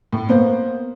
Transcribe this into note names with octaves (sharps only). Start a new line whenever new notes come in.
A2
A#3 B3 C5